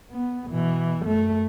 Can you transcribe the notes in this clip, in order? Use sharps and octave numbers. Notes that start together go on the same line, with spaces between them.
B3
B2 E3
F#2 A3